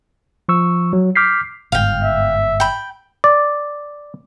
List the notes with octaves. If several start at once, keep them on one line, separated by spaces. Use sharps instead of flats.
F3 C#6 E6
F#3
D6 F6 G6 B6 C7
G1 G#2 F5 G5
E5
G5 B5
D5